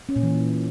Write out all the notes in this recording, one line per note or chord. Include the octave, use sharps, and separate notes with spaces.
C#4
A#2
E3